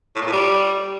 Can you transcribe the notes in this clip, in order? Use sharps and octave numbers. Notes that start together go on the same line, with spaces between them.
A2
A#2
A2
G3